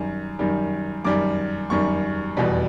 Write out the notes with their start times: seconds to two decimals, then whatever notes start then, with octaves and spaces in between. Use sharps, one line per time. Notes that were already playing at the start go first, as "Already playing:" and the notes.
Already playing: F#2 D#3 G3
0.39 F#2 D#3 G3
1.04 F#2 D#3 G3 D6
1.70 F#2 D#3 G3 C#6
2.37 F1 E2 B2 G3